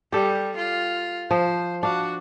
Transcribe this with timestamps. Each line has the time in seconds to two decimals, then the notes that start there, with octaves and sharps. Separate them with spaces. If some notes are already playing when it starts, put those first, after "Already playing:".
0.13 G3 G4 A4
0.57 F4
1.31 F3 C5
1.83 D4 F#4 F5